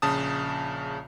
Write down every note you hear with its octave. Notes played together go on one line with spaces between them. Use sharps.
A#1 C#3 A5 D#6